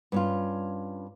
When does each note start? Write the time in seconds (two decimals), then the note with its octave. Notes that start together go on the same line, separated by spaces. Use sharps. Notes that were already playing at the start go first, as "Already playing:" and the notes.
0.12 G2 C#4 F4